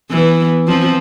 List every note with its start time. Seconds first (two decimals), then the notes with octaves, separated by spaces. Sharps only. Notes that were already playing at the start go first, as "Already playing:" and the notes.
0.10 E3 B3
0.67 F3 C4